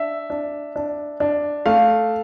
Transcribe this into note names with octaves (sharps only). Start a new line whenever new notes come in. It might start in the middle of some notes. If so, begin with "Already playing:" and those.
Already playing: D4 E5
D4
D4
D4
A3 F5